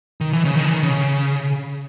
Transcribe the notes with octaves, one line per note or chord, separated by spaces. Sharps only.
D#3
E3
C#3
D#3
E3
D#3
C#3